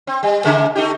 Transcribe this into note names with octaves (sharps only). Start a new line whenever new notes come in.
C4
G3
C#3 G#3 A#3
A3 D#4 G4